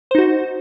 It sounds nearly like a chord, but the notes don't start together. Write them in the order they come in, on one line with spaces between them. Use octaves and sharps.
C5 D#4 F#4